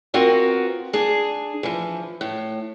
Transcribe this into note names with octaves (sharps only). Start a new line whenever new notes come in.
B3 C4 F4 F#4 A#4
D4 G#4
E3 F3
A2